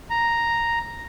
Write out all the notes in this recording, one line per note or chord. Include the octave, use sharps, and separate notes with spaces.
A#5